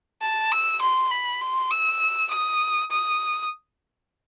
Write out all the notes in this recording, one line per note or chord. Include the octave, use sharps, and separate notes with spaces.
A5
E6
C6
B5
C6
E6
D#6
D#6